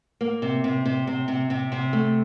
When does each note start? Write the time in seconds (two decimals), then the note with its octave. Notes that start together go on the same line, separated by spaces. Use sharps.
0.21 A#3
0.42 C3
0.64 C3
0.85 C3
1.07 C3
1.28 C3
1.50 C3
1.72 C3
1.93 A3